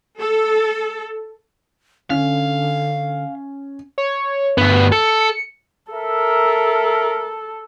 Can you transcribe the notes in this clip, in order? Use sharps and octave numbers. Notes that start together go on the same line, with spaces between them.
A4
D3 C#4 F5
C#5
D2 G2 B3
A4 C#7
A4 A#4 E5